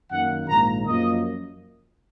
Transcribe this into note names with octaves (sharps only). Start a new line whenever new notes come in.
F#2 D#3 A#3 F#5
A#1 G#2 D#3 A#3 A#5
F#2 F3 A#3 D#5